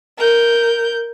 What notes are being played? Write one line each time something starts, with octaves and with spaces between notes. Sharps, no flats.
A#4 G6